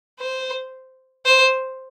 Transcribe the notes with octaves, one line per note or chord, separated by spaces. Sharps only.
C5
C5